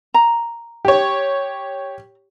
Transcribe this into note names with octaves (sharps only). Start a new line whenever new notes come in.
A#5
G4 C#5